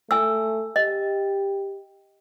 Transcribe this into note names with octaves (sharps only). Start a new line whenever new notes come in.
A3 G#5 E6
G4 D#5